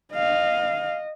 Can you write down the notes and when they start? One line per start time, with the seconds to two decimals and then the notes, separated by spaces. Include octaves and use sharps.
0.13 D#5 F5